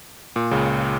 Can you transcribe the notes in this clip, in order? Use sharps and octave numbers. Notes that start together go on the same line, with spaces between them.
A#2
C#2 C#3